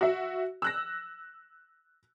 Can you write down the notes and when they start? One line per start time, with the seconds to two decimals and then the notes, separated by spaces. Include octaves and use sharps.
0.01 F#4 E5
0.62 E6 F#6 A#6